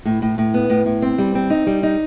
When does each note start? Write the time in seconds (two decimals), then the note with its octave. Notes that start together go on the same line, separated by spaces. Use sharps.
0.05 A2
0.22 A2
0.38 A2
0.54 B3
0.70 A2
0.86 A2
1.02 C4
1.18 G3
1.35 C4
1.50 D#4
1.67 G3
1.83 D#4